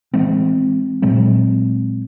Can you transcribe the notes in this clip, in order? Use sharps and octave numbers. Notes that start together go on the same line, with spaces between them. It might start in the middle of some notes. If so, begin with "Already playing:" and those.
E3 G#3 C4
A#2 F#3 G#3 C4